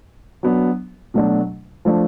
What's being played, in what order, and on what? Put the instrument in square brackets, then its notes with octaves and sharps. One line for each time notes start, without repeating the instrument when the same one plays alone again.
[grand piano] F#3 B3 D4
B2 F#3 A3 D4
F3 A3 D4